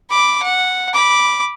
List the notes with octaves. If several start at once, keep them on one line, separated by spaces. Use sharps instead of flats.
B5 D6
F#5
B5 D6